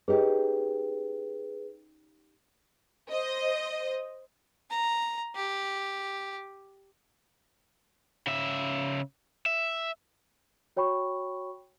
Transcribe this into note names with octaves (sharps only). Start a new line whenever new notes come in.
C#4 D#4 G4 G#4 B4
C5 D#5
A#5
G4
C#3 E5
E5
F#4 C#5 G5 B5 C#6